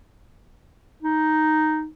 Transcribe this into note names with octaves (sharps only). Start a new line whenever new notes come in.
D#4